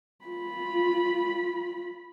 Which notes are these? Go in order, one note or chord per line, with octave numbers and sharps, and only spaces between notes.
F4 B5